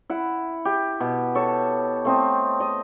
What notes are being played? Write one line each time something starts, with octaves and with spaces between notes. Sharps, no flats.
E4 F#5
G4
B2
A4 C#5
A3 C4 D#5
D#5